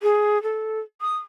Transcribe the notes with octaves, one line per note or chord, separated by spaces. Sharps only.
G#4
A4
D#6